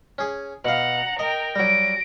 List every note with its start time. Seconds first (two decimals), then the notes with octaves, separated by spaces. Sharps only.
0.18 C#4 G#4
0.65 B2 F5 F#5 A#5
1.19 A#4 D#5 G5
1.55 F#3 G3 A#6 D7